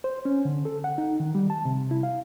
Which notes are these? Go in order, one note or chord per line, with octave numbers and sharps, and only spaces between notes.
C5
C#4
D3
A4
F#5
D#4
D#3
G3
A5
C3
E4
F5